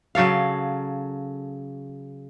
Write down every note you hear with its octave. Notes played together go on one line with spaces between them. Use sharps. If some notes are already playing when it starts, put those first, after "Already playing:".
C#3 F#3 A4 F5